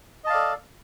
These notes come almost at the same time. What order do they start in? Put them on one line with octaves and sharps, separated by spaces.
D#5 A5 F5 D5 A4